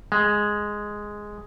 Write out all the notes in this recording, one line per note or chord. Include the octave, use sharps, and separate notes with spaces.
G#3